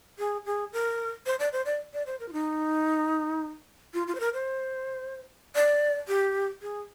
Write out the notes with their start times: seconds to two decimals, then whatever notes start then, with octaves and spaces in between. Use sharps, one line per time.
0.19 G#4
0.46 G#4
0.73 A#4
1.26 C5
1.39 D5
1.53 C5
1.66 D5
1.93 D5
2.06 C5
2.20 A#4
2.29 F4
2.33 D#4
3.94 F4
4.08 F4
4.15 C5
4.20 A#4
4.34 C5
5.55 D5
6.08 G4
6.62 G#4